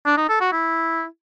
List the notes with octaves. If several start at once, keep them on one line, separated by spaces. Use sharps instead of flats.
D4
D#4
A4
F#4
E4